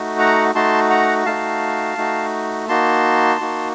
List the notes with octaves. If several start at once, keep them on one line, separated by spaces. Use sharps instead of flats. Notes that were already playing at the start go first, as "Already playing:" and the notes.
Already playing: A3 D#4 F#4
F#5 A#5
A3 D#4 F#4 A5 C6
F#5 A#5
A3 D#4 F#4 F5 A5
A3 D#4 F#4
A#3 D#4 F#4 A5 C6
A#3 D#4 F#4